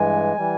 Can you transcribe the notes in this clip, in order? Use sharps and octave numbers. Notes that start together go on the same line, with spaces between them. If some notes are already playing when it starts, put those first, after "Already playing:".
Already playing: G2 E3 G#3 G#5
E3 G3